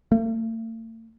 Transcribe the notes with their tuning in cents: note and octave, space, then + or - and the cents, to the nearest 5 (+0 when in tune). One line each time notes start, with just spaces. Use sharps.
A3 +45